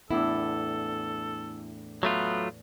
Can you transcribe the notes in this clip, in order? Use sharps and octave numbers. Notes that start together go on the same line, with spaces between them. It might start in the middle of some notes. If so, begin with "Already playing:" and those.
E2 A2 D4 E4 A4
F#3 A3 B3 F4